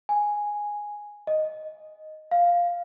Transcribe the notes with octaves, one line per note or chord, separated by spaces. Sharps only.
G#5
D#5
F5